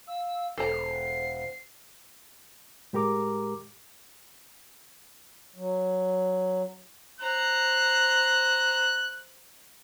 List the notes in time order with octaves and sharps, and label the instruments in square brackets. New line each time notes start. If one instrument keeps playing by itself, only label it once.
[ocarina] F5 [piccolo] E6
[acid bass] E1 [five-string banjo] A4 A#5 [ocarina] C5 [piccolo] C7
[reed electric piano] A2 G#3 G4 A#4 A#5 D6
[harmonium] F#3
[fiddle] C5 A#5 [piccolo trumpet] F#6